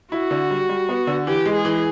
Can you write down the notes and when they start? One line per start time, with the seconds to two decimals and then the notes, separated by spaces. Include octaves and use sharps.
0.12 E4 F#4
0.31 D3
0.51 G3
0.69 G3
0.89 B3
1.07 D3
1.27 E3 G4
1.46 G#3
1.55 G#4
1.65 E3